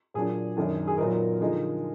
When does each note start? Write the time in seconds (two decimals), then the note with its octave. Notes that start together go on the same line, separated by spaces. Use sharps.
0.14 A#2 F#3 D4 G#4
0.57 F#2 D#3 A#3 D4
0.87 G#4
0.98 A#2 F#3 B3 D#4 A#4
1.40 D3 F3 G#3 D#4